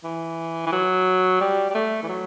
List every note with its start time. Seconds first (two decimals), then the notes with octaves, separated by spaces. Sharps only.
0.04 E3
0.67 E3
0.72 F#3
1.41 G3
1.70 G3
1.75 A3
2.03 E3
2.08 F#3